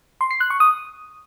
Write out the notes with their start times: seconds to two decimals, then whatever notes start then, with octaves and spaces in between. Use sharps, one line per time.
0.21 C6
0.31 C7
0.40 F#6
0.50 C#6
0.60 D#6